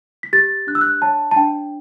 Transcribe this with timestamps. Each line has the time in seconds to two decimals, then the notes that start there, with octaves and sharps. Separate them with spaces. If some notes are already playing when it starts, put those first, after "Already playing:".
0.23 B6
0.33 G4 A6
0.67 D4 F#6
0.75 E6
0.81 F#6
1.02 C#5 A5
1.31 A5
1.36 D4 G5